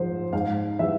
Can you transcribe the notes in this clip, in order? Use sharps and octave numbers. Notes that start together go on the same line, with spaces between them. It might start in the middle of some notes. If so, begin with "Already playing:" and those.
Already playing: G#2 F3 C5
G#2 F5
E3 G3 E5